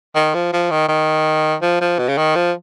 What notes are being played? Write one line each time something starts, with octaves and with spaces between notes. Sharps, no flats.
D#3
F3
F3
D#3
D#3
F3
F3
B2
C#3
D#3
F3